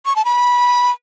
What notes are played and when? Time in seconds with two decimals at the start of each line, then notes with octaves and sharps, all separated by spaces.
0.06 C#6
0.16 A5
0.25 B5